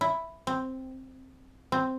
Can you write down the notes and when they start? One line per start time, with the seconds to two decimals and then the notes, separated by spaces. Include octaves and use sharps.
0.01 E4
0.47 C4
1.72 C4